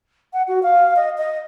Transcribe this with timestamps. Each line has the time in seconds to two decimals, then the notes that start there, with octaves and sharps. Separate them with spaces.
0.33 F#5
0.48 F#4
0.63 F5
0.96 D#5
1.18 D#5